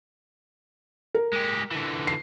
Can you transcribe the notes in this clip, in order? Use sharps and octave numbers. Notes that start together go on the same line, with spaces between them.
A#4
G#3 G4
D3 E3
C7